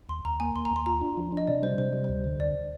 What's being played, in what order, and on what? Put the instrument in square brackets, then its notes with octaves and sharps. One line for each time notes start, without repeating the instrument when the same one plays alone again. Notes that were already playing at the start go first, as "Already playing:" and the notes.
[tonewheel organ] D#2 [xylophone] C6
[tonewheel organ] D#2 [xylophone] A#5
[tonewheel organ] A#3 [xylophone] G#5
[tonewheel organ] D#2 [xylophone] C6
[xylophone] A#5
[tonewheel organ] D#2
[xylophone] C6
[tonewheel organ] F4 [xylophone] A#5
[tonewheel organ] D4
F3
[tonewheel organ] D4 [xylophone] D#5
[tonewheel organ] C3 [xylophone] D5
[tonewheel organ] G3 [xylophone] C5
[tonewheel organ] C3 [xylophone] C5
[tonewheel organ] G3
[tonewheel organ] D2 [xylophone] C5
[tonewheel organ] D3
[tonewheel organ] D2 [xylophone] D5